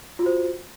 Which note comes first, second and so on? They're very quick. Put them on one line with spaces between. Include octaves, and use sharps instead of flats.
F4 F#4 C5